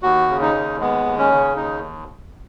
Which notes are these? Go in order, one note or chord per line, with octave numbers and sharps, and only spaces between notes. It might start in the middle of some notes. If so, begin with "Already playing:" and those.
D#2 F#4
C#3
D#4
D#2
G#3 B3
D#2
C#4
C#3
D#2 D#4